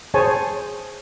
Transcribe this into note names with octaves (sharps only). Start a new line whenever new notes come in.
G#4 C5 C#5 G#5 A5